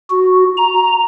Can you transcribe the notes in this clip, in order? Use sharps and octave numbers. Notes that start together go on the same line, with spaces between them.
F#4
A#5